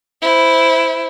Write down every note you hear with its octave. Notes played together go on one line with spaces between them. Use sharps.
E4 C5